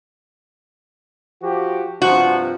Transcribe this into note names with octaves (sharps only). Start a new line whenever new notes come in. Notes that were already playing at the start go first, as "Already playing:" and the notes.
F3 F#4 G4
G2 C3 F3 F#4